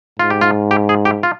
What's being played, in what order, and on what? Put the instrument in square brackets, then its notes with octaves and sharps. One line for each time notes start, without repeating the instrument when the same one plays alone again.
[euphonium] G#2 [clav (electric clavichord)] F4
[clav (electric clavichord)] G4
F4
G4
G#4
G4
F4